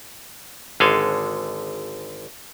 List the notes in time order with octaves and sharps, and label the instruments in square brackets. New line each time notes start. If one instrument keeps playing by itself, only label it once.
[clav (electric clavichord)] G#1 D3 G#3 A4 F5 G#5